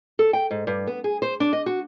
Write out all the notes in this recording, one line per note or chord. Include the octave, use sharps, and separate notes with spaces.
A4
G5
G#2
G2
B3
G#4
C5
D4
D#5
F#4